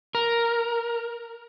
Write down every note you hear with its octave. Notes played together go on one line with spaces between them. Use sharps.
A#4